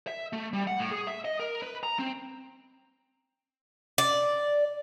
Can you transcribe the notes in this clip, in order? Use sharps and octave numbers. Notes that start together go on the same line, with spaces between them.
E5
A3
G3
F#5
A2
G#4
E5
D#5
A#4
B4
A#5
C4
D5